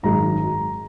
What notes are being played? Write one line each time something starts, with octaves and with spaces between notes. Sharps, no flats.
G#1 F#2 D#3 G#3 A#5